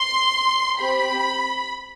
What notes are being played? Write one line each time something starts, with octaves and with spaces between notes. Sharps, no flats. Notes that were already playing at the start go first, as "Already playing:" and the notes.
Already playing: C6
C4 G4 B5